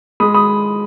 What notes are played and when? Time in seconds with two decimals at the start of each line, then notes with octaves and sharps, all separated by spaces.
0.20 G#3 B5 D#6
0.34 B5 D#6